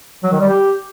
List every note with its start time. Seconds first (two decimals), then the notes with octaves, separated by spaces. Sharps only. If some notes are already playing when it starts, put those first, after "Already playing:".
0.23 F#3
0.32 D#3
0.40 G3
0.48 G4